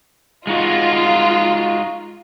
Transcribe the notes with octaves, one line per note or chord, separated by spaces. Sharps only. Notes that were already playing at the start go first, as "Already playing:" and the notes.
G#3 D#4 F4 F#4